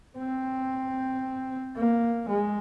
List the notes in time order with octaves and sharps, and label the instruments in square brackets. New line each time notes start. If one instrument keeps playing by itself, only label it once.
[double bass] C4
A#3
G#3